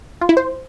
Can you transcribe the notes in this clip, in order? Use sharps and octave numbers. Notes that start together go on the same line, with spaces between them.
F4
E4
C5